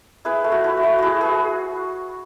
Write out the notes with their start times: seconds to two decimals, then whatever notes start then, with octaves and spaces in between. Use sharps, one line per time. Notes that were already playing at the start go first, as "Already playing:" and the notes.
0.25 E4 G#4 B4
0.44 A3
0.52 F#4
0.64 E4
0.77 F#4
0.83 A3
0.98 E4 F#4 G#4
1.21 G#4 B4